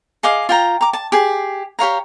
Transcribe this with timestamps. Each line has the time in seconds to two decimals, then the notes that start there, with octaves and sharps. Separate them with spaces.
0.23 G#4 D#5 F5 D6
0.49 F4 G5 A#5
0.81 A#5 D6
0.93 A5
1.12 G4 G#4
1.79 G4 C#5 F5 A#5